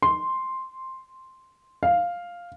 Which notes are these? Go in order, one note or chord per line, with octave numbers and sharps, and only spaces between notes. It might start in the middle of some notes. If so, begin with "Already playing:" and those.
C6
F5